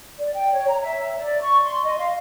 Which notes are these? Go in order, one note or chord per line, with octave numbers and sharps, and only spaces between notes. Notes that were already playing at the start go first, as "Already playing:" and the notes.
D5
G5
C#5
A#5
E5
D5
C#6
C6
D#5
F5